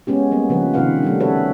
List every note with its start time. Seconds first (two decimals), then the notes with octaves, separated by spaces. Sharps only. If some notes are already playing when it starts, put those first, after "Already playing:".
0.07 G#3 B3 C#4 G4
0.32 G3 A#3 B3
0.49 C#3 F3 C4 B4
0.74 C3 D#3 C4 B4 F5 F#5
1.03 G3 A3 D4
1.20 C#4 F#4 A4 B4 C#5